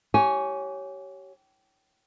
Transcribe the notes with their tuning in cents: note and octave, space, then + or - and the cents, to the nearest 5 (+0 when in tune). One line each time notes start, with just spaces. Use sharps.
G4 -30 C#5 +0 G#5 +0